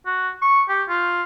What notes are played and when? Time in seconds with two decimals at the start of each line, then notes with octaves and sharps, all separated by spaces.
0.06 F#4
0.42 C#6
0.69 G4
0.89 F4